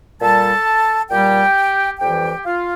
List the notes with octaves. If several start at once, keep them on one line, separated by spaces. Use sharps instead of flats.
A#2 G3 A4 A5
A#2 G3 G4 G5
F2 E3 G3 G4 G5
F4 F5